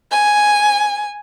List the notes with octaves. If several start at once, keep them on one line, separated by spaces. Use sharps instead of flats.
G#5